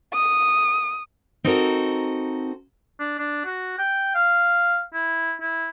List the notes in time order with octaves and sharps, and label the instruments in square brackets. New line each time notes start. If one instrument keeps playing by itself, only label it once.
[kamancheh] D#6
[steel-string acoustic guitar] C4 D#4 F#4 A4 A#4
[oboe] D4
D4
F#4
G5
F5
E4
E4